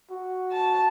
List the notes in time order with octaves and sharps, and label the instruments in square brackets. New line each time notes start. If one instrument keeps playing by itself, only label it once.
[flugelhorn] F#4
[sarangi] A5